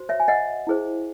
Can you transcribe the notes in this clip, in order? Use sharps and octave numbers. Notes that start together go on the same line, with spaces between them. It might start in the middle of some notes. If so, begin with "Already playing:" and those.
Already playing: F#4 C5
C#5 E5
G#5
D#5 F#5
E4 G#4 C5